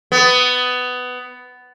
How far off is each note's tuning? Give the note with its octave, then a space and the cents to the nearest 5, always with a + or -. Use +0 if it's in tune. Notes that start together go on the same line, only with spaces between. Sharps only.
B3 +15